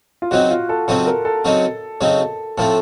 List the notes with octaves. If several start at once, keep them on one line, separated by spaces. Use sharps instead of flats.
F4
C#3 F#3 C4 D#4 F#4
F4
A4
C#3 F#3 C4 D#4 A4
A#4
A4
C#3 F#3 C4 D#4
C#3 F#3 C4 D#4
A2 F3 A3 C4 A4